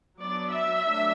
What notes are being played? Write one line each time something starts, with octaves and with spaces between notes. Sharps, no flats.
F#3 B3 D4 D5
E5
F#3 A3 D4